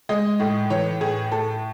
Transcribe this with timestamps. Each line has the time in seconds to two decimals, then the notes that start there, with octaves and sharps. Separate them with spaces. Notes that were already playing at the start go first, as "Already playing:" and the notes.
0.09 G#3 D#5
0.40 A2
0.70 E3 C#5
1.01 A2 G#4
1.31 A2 A4